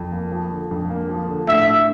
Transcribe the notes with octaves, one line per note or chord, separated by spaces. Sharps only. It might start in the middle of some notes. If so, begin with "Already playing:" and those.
Already playing: F2
A#3
F3
D3
F2
A#3
F3
D3
A2 E5
D4